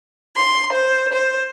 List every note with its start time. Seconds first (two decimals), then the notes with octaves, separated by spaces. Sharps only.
0.36 C6
0.72 C5
1.12 C5